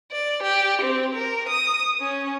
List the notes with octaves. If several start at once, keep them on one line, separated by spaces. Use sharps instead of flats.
D5
G4
C4
A#4
D#6
C#4